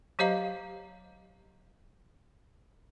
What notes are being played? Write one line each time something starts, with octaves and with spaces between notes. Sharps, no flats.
F#3 G4 C5 D#5 F5 A#5